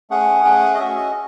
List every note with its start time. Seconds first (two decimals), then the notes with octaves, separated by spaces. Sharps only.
0.10 A3 C#4 G#4 F#5
0.44 A3 C#4 G#4
0.74 D#5
0.79 C#4 F#4 E5
0.96 D#5